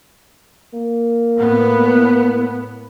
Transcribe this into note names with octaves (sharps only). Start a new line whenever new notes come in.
A#3
A2 B3